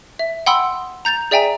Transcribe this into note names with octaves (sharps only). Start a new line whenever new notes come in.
E5
F#5 G5 B5 C6 D#6 E6
A#5 G6 A6 F7
G#4 D5 E5 G5 G#5 A#5